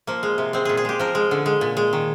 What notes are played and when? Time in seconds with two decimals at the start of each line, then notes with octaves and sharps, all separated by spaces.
0.07 F3 A#3
0.23 G#3
0.38 C3
0.53 G#3 C4
0.65 A#2 G#4
0.77 G#4
0.85 G#3 G4
0.99 F3 A#4
1.15 G#3
1.31 D3
1.46 G#3
1.61 A#2
1.77 G#3
1.93 D#3